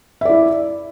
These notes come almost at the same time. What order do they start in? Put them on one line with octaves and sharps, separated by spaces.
E5 D5 E4